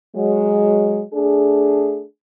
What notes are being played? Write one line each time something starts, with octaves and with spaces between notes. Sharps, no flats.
F#3 G#3
A3 D4 G#4